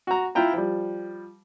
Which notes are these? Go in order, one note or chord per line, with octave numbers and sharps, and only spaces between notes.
F#4 A#5
E4 F4 G5 A#5
F3 G3